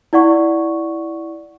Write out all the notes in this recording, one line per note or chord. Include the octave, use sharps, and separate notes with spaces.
E4 D5 F#5 C#6